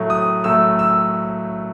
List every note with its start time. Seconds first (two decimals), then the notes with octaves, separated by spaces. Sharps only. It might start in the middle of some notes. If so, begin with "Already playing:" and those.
Already playing: A2 F#3 A3
0.10 D#6
0.44 A2 F#3 A3 E6
0.79 E6